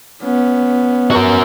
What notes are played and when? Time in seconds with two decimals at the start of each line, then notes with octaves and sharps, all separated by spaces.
0.23 B3 C#4
1.11 F#4 A#4